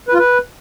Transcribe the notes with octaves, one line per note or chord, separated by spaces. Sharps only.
B4
F4
B4